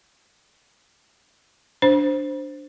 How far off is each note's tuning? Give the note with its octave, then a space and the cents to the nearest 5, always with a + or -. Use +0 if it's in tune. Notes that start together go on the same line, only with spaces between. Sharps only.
D4 +0 C5 +0